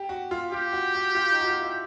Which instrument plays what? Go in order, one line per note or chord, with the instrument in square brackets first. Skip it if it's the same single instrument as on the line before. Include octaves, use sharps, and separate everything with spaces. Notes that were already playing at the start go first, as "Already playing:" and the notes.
Already playing: [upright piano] G4
F#4
F4
[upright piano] F4 [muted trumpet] G4
[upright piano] F#4
F#4
F4
D#4
F#4
F4
E4